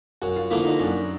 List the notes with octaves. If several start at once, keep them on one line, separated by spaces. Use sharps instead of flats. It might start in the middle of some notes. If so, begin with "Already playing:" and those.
F#2 F#4
F4
D3 F3 A#3 E4
D#4
F#2 D4